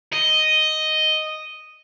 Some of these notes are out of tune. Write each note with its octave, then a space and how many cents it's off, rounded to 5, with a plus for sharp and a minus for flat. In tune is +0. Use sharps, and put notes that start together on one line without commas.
D#5 +0